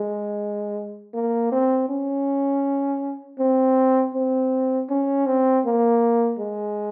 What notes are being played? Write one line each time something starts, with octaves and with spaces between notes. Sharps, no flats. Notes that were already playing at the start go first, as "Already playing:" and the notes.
Already playing: G#3
A#3
C4
C#4
C4
C4
C#4
C4
A#3
G#3